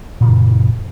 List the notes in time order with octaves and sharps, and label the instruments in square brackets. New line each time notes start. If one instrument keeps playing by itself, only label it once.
[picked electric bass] A#2
C#3
E3
F#2